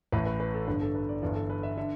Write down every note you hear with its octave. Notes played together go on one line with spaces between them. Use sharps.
A1 A2 E3 B4
B4
B4
A4
G1 G2 D3 B4
A4
B4
D5
G1 G2 E3 D5
A4
B4
E5
D3 E5